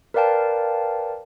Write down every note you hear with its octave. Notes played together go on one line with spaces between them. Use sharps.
A#4 B4 D5 F5 G5 A5